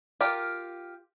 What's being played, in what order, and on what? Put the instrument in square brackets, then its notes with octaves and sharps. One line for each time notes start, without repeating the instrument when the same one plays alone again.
[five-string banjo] F4 G4 A#4